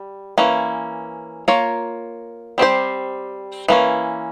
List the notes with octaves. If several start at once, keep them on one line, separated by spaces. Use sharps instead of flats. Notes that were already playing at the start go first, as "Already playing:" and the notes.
Already playing: G3
E3 A#3 C#4
A#3 F4 A#4 C#5
G3 C4 G4 C5
E3 A#3 C#4